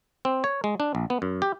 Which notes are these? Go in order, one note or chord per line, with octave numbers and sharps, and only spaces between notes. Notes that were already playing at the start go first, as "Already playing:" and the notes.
C4
C#5
G#3
D4
A#1
B3
F#2
G4